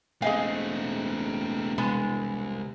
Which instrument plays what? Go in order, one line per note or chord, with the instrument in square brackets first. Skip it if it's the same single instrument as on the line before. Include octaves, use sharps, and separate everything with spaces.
[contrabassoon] E1 [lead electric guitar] A3 C4 [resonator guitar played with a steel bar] G#4 D#5 G#5 [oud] F5
[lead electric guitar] C2 [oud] G#3 [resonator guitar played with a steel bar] B3